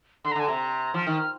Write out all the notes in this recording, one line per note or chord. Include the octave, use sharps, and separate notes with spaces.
D3 C6
A#5
D3 G#5
C3 A#5
F3 F6
D#3 F6
F6